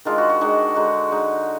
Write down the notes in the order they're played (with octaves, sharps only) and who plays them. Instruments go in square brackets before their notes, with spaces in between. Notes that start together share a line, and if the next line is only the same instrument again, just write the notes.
[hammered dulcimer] D#3 G#3 D4 F4
F#4
F#4
D#3 G#3 D4 F#4
D3 G#3 D#4 F#4
D3 G#3 D#4